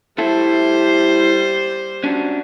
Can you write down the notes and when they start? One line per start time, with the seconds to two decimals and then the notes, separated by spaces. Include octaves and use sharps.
0.18 G3 E4 A4 C5
2.04 C#4 D4 F#4